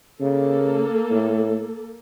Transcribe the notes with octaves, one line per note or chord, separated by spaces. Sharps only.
C#3 A#3 A4
A2